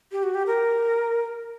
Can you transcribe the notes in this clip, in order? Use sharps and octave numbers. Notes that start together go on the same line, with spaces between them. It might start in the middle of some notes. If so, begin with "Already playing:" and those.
G4
F#4
G4
A#4